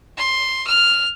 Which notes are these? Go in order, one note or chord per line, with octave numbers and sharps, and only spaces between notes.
C6
F6